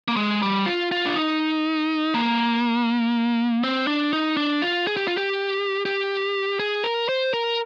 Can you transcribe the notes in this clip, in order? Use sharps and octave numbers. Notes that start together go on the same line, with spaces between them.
A#3
G#3
G3
F4
F4
D4
D#4
A#3
C4
D4
D#4
D4
F4
G#4
G4
F4
G4
G4
G#4
A#4
C5
A#4